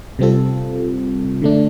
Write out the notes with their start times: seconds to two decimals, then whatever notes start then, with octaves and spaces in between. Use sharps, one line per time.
0.19 C3 G3 C4 F4 A4
1.42 D3 A3 D4